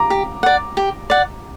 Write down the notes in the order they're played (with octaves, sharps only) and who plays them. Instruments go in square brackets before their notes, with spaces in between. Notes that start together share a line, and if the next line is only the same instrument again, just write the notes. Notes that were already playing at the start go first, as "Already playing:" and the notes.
Already playing: [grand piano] A#5 D6
[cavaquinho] G4
D5 F#5
G4
D5 F#5